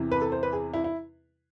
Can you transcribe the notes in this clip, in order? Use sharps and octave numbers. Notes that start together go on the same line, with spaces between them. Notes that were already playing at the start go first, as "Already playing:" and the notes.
Already playing: E2 C3 E3
B4
A4
C5
B4
G#4
E4
E4